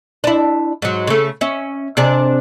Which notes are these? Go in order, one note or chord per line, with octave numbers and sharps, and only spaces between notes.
D4 E4
G#2 F#3
C#3 A3
C#4 E5
C3 D4 G#4